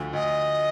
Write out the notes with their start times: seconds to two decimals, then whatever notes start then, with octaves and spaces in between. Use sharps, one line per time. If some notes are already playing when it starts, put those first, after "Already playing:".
Already playing: D2 D3 F3
0.13 D2 D#5